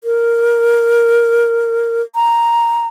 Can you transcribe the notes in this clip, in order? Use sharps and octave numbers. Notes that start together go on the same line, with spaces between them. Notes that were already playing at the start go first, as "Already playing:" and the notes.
A#4
A#5